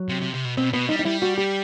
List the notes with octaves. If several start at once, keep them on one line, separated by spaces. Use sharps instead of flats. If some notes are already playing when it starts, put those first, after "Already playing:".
Already playing: F#3
C3
C3
C3
B2
B2 C4
B2 B3
G3 D#4
D#4
G3 E4
F#4
G4